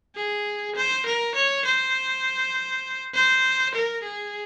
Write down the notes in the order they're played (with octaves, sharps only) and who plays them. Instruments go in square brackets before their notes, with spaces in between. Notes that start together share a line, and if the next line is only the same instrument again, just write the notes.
[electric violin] G#4
C5
A#4
C#5
C5
C5
A#4
G#4